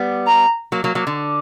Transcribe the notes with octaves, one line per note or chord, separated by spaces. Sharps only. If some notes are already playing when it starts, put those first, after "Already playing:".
Already playing: G3 B3
A#5
F#3 A#3
F#3 A#3
F#3 A#3
D3